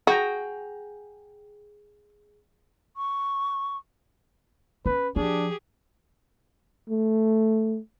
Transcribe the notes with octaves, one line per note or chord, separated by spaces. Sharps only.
F#4 G#4 G5 A#5
C#6
C#4 B4
F3 D4 G4 G#4
A3